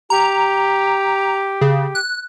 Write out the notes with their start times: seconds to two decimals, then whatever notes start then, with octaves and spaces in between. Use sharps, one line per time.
0.10 G4 A#5
1.61 C#3
1.95 F#6